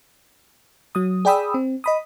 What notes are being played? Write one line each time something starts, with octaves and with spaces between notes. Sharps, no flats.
F#3 D#6
G#4 D5 G5 B5 D#6 E6
C4
D#5 B5 D#6